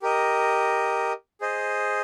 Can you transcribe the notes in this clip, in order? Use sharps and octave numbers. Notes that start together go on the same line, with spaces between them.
G4 A#4 D#5
G#4 C5 D#5